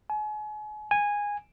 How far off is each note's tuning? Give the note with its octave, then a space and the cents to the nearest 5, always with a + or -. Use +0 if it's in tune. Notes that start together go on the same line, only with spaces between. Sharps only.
G#5 +40
G#5 -10